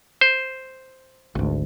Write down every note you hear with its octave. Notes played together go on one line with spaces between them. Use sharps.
C5
G#1 D2